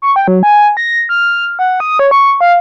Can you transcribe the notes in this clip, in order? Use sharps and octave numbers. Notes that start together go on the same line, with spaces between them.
C#6
G5
F#3
G#5
A#6
F6
F#5
D#6
C#5
C#6
F5